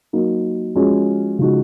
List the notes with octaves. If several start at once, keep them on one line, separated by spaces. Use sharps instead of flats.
F#3 A#3 D#4
F3 G#3 C#4 F#4
C#3 F3 G#3 D#4 F#4